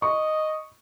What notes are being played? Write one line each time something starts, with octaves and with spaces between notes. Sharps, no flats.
D#5 C#6